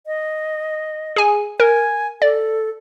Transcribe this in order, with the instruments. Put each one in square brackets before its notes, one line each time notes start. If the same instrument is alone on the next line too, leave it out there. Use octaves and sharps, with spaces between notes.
[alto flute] D#5
[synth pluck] G#4 G#5
[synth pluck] A#4 [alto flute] G#5
[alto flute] A4 [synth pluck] D5